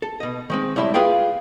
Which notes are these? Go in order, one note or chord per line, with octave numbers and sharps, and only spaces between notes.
A4
B2 D#5
D#3 G#3 C4
A2 G3 E4 E5 C6
F4 G#4 B4 F5 G5